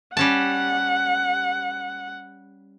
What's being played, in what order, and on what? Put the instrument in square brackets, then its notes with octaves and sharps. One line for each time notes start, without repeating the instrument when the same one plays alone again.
[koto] G3 C#4 A5 [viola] F#5